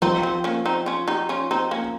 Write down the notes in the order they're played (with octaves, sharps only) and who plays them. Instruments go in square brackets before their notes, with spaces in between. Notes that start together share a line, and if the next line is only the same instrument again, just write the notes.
[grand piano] F3 [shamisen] C4 D#4
[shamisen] C4
A#3 C#4
C4 D#4
C#4 F4
D#4 G4
C#4 F4
C4 D#4
A#3 C#4